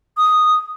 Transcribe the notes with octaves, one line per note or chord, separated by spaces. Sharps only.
D#6